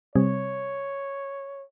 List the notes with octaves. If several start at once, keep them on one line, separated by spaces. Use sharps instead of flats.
C3 G3 C4 C#5